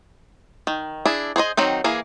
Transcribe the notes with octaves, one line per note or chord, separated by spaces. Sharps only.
D#3
D4 E4 G#4
G#4 C5 C#5 D#5
D#3 F#3 C4 D#4
E3 A#3 G#4